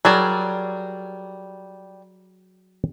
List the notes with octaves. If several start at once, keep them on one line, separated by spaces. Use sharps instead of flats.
F#3 G3 G#4 A#4 D5 A5